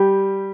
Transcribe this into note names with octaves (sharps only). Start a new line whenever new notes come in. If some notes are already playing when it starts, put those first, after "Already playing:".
Already playing: G3 G4